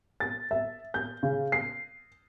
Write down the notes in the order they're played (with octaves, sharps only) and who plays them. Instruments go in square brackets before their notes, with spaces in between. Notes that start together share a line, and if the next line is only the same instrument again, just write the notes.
[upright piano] A6
E5
G6
C#3
C7